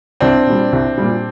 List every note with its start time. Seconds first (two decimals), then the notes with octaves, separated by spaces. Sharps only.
0.20 C2 C4 D4
0.46 A#2 G3
0.72 C2
0.98 A#2 G3